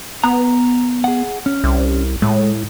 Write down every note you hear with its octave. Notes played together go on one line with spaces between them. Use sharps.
B3 A#5
G#4 F#5
C#4
C2
A2 G#3